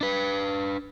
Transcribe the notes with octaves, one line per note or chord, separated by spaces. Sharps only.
D4 B4